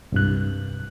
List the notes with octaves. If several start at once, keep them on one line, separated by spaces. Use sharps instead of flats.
C2 G2 F#6